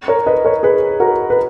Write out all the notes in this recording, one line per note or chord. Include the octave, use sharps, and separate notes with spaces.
A#4 C#5
B4 D#5
A#4 C#5
G#4 B4
F#4 A#4
B4